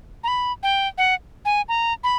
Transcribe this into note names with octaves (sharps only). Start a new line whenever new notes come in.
A#5
B5
G5
F#5
G#5
A#5
B5